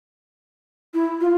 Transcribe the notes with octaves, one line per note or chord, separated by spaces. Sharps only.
E4
F4